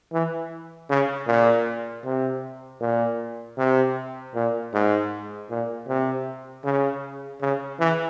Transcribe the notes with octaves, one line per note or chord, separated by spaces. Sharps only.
E3
C#3
A#2
C3
A#2
C3
A#2
G#2
A#2
C3
C#3
C#3
E3